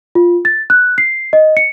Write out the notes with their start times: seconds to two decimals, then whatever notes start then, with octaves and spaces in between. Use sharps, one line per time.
0.15 F4
0.45 A6
0.70 F#6
0.98 C7
1.33 D#5
1.57 C#7